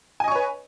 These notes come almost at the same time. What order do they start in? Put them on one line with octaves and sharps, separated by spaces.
G#5 D#5 C#6 C#5 B4